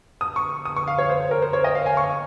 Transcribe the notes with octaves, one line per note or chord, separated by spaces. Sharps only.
D#6
C#6
D#6
C#6
F5
C#5
C5
C5
A#4
C5
C#5
D#5
F5
G#5
C#6